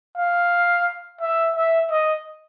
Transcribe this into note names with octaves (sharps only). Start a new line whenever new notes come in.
F5
E5
E5
D#5